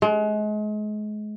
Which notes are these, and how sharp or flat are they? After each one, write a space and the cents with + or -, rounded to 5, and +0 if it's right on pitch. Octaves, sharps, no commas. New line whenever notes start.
G#3 +35